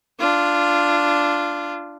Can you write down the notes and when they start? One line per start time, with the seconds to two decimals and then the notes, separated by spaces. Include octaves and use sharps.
0.20 D4 F4